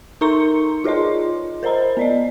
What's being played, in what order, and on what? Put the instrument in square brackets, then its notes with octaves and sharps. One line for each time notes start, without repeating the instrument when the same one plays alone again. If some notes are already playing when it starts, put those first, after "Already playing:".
[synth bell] D#4 A#4 A#5 C6 C#6 C#7
F4 G#4 C#5 D#5 C6
A#4 C5 D#5 A#5 B5
B3 D5 D#5